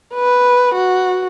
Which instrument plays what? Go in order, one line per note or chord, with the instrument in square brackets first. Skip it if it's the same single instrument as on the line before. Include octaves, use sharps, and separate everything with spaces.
[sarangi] B4
F#4